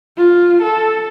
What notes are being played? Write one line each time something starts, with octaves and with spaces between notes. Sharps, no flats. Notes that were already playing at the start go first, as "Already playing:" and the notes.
F4
A4